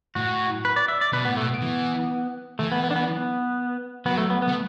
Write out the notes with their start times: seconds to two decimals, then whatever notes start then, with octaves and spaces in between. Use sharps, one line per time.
0.15 A2 F#4
0.65 B4
0.76 D5
0.88 E5
1.01 D5
1.13 B2 B4
1.25 A2 B3
1.37 A3
1.41 B2
1.50 B3
1.62 E3
2.59 E3 A3
2.72 B3
2.84 B3
2.91 D4
2.96 B3
3.08 B3
4.06 F#3 B3
4.18 A3
4.30 B3
4.42 B3
4.48 A3